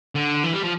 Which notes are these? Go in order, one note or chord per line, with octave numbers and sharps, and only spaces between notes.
D3
E3
G3
F3